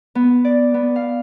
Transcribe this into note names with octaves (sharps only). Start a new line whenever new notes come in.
B3
D5
B3
F5